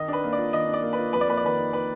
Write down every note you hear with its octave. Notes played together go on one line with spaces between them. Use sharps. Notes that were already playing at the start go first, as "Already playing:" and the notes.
Already playing: D#3 D#5
D4 B4
A#3
D5
F4
D#3 D#5
D4
D5
A#3
B4
F4
F2 B4
D5
A#3 B4
D5
D#3 B4
D#4
B4